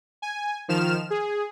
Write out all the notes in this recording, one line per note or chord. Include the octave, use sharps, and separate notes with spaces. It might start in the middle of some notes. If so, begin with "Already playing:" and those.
G#5
D#3 F3 F6 E7
G#4